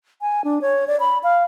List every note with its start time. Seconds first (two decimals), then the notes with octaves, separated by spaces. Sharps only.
0.21 G#5
0.44 D4
0.62 C#5
0.88 D5
1.00 B5
1.23 F5